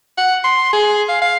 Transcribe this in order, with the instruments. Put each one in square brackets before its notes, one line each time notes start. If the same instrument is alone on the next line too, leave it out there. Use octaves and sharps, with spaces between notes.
[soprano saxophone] F#5
C6
G#4
F5
F5